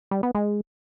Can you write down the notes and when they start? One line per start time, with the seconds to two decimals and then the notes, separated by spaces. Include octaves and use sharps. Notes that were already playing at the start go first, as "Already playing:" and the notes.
0.11 G3
0.23 B3
0.35 G#3